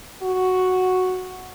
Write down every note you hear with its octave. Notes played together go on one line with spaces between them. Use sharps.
F#4